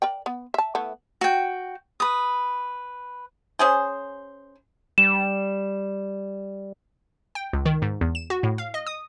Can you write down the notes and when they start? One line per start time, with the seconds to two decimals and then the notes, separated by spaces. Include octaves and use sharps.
0.02 A#4 D5 G5
0.26 B3
0.54 E5 A5
0.75 A3 B3 E4
1.21 F#4 G5
2.00 B4 D#6
3.59 C#4 G#4 C5
4.98 G3 E7
7.35 G5
7.53 C#2
7.66 D#3
7.82 G#2
8.01 E2
8.15 E7
8.30 F#4
8.43 A2
8.58 F5
8.74 D#5
8.87 D#6